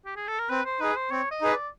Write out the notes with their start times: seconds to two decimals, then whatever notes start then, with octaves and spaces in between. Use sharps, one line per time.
0.06 G4
0.16 G#4
0.28 A4
0.39 A#4
0.50 C4 B4
0.65 C5
0.80 D#4 G#4 B4
0.96 C5
1.11 C4 C#5
1.31 D#5
1.41 D#4 G#4 B4
1.52 D5